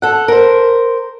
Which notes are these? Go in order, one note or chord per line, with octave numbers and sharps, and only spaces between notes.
A4 F#5
A#4 C5